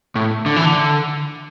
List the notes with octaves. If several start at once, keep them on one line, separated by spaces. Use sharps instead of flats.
A2
D3
E3
D3